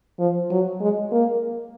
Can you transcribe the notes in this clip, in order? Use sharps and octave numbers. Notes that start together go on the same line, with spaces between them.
F3
F#3
G#3
A#3